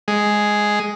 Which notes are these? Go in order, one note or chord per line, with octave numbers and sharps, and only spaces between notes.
G#3